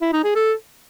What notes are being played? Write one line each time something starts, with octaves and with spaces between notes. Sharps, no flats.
E4
D#4
G#4
A4